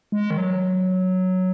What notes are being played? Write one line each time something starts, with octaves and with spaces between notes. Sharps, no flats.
G#3
D#3
F#3